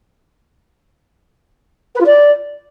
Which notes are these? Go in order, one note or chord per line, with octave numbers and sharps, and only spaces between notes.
B4
F4
D5